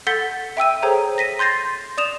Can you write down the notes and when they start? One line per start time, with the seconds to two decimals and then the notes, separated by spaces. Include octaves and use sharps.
0.07 A4 F#5 G6 A6 B6 G7
0.57 E5 G5 E6 D#7
0.83 G#4 A4 C5 C#5 G5 A#5
1.18 A#6 B6 D#7
1.39 C6 G6 A6 A#6 C7
1.97 D5 D#6 E7 F7